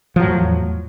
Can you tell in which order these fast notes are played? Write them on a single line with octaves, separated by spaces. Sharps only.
F3 F#3 A2 E2